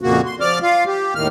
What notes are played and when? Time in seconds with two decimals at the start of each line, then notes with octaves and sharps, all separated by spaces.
0.01 F2 A#2 C#3 A#3 F#4
0.26 C6
0.40 F3 D5 D6 F6
0.63 F4 F5
0.86 G4
1.15 D#2 A2 D#3 F6